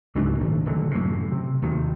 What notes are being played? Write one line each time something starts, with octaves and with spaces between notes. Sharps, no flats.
C#2 G#2 F#3 D4
G#1 A#2
D#1 D3 F#3
F#2 A2 C3
C3
D#2 C3 D#3